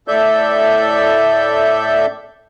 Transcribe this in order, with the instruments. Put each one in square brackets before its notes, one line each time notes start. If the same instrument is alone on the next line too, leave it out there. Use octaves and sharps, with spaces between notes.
[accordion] A2 A4 D5 E5 G6